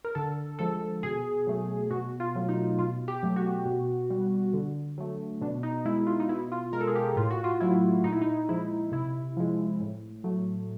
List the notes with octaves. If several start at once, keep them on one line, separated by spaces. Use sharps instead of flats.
A#4
D3 A4
F3 G#3 A4
B2 G#4
F#3 A3
B2 F#4
F4
F#3 A3
D#4
B2 F4
G4
F#3 A3
F#4
B2
G3
D3
F#3 A3
B2 D4
D#4
G#3 E4
F4
D#4
B2 E4
F4
G#3 A#4
A4
G#4
G4
A2 F4
F#4
F4
F#3 A3 E4
A#2 D#4
E4
D#4
F3 G#3 E4
C3 E4
F3 G#3
A2
F#3 A3